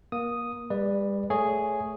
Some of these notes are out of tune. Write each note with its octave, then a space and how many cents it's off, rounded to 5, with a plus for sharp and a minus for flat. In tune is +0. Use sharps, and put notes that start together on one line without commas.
A#3 +25 D#6 +0
G3 +40 B4 -5 D5 +10
A3 +0 G#4 +0 C#5 +0